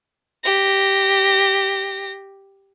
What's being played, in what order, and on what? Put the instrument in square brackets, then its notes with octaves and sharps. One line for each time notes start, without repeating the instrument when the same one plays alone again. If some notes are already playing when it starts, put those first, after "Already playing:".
[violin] G4 A#6